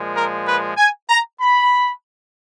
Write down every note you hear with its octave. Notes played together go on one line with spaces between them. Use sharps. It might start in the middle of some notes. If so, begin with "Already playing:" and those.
Already playing: A#2 F3 G#3
A#4
B4
G#5
A#5
B5